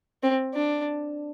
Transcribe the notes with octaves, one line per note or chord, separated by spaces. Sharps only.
C4
D4